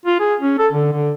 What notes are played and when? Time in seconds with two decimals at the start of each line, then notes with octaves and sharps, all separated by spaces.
0.05 F4
0.20 G#4
0.40 C#4
0.58 A4
0.72 D3
0.92 D3